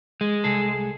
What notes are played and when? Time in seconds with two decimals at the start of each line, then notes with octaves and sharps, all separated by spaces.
0.21 G#3
0.44 C2 G#4 A4